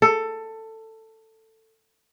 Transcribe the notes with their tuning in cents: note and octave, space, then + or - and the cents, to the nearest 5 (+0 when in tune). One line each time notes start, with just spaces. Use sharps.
A4 +15